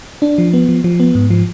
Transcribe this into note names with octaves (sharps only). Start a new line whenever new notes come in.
D4
F3
B3
F3
F3
B3
G#2
F3